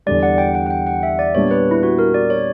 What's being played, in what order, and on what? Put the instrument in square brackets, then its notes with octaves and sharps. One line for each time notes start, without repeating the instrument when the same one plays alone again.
[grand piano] E2 D3 G3 [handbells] D5
[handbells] F#5
G5
F#5
F#5
G5
F#5
E5
D5
[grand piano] A#2 G3 B3 D4 [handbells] C#5
[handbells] B4
E4
F#4
A#4
D5
C#5